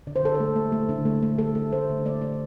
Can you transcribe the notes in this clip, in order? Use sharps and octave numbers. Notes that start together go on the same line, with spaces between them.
D3 D5
C5
D3 A4
C5
A3
A3
A3
D3
A3
A3
A3 A4
A3
A3 C5
D3
A3 D5
A3 D5